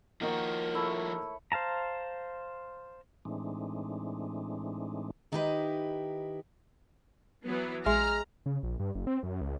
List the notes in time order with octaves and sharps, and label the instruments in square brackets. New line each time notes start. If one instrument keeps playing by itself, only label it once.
[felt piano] D#3 A#3 D#4 [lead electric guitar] F3 F#4 [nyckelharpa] A#4
[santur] A3 E4 C#5
[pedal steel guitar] C5 F5 A5 A#5
[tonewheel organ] A2 E3 G#3 C4 D4 D#4
[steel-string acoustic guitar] D#3 D#4 E4 G4 G#4 B4
[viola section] E3 F#3 B3
[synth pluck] A#1 E5 C6 [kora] G#3 [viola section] A#5 [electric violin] F6
[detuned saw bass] C#3
A#1
G2
F#1
C4
F#2
C#2